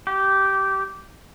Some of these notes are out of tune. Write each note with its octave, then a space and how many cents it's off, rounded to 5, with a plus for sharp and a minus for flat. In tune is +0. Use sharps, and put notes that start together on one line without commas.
G4 -15